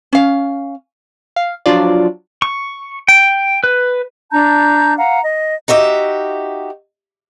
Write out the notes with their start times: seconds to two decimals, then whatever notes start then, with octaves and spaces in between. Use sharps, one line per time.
0.13 C#4 F5
1.36 F5
1.66 F3 F#3 D4 F4 D5
2.42 C#6
3.08 G5
3.64 B4
4.31 D4 A5 A#5 G6
4.98 F5 F#5 A#5
5.23 D#5
5.68 D#4 F#4 G4 E5